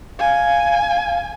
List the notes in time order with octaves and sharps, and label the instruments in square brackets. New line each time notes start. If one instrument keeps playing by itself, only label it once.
[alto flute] F5 [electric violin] G#5